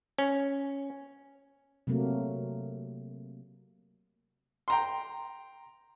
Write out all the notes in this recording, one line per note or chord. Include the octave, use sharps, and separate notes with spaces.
C#4
C3 F#3 A3 A#3
G5 A#5 C6